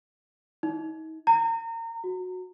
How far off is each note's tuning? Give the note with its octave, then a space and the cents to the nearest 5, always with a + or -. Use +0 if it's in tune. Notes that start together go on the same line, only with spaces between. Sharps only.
D#4 +40
A#5 -30
F#4 -10